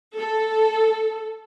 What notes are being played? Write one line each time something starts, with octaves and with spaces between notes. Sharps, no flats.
A4